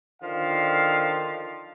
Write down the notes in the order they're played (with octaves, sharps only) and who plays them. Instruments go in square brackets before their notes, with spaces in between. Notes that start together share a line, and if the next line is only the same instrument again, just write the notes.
[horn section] D3 D#3 F3 F5